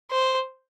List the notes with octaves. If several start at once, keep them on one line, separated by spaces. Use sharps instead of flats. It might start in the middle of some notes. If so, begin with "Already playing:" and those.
C5